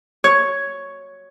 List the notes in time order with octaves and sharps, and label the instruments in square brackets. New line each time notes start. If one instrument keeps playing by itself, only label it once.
[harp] C#5